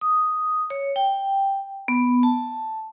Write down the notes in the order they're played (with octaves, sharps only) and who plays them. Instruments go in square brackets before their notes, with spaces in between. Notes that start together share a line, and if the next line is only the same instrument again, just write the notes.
[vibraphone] D#6
C#5
G5
B3
A5